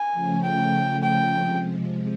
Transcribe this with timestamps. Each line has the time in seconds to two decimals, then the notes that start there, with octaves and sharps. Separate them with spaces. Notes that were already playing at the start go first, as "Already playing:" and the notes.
Already playing: G#5
0.13 C#3 F3 A3 C#4
0.42 G5
1.02 G5
1.32 C3 F3 G#3